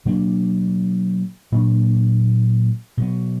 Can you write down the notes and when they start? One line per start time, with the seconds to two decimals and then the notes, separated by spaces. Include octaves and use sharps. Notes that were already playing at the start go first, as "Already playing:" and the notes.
0.05 B2 F#3 A#3 D4
1.52 A#2 F#3 A#3 D4
2.97 B2 F#3 B3